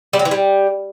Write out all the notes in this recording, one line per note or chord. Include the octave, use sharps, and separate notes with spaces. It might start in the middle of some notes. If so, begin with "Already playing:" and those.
G3
F#3
E3
G3